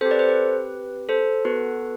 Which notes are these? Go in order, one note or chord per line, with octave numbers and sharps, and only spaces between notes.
C4 G4 A4 C5
B4 D5
A4 C5
B4
A4 C5
B3 F#4 A4 B4